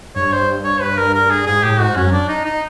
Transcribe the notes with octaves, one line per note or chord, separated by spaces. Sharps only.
G2 C#5
C5
C#5
B4
A#4
A#4
G#4
G#2 G#4
A2 G4
G#2 F#4
F#2 C#4
D4
D#4
D#4